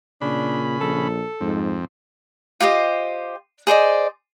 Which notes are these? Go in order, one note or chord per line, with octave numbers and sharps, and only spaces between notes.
A#2 C#3 D4 B5
A#1 A4
F2 G#2
F4 G4 C5 D#5
G#4 C5 D5 D#5